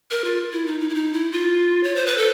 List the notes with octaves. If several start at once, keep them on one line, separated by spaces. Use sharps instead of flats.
A#4
F4
E4
D#4
D#4
E4
D#4
E4
F4
C#5
C5
B4
A4